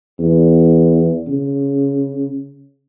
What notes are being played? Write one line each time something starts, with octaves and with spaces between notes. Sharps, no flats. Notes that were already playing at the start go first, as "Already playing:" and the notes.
E2
C#3